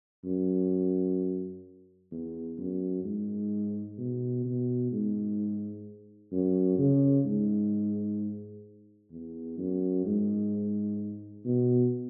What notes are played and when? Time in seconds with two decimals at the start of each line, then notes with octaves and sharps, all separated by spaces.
0.25 F#2
2.11 E2
2.58 F#2
3.04 G#2
3.98 B2
4.45 B2
4.92 G#2
6.32 F#2
6.78 C#3
7.25 G#2
9.11 E2
9.58 F#2
10.05 G#2
11.45 B2